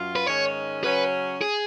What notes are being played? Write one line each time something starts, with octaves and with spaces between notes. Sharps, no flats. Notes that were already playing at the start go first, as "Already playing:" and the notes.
Already playing: F#2 F#3 F4
B4
G#2 D#3 G#3 C#4 C#5
C#3 F#3 C#4 B4
G#4